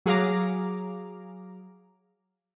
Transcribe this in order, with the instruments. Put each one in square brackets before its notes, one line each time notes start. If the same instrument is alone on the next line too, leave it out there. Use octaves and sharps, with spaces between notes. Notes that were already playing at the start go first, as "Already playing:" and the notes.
[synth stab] F#3 G#4 F5 A#5 D6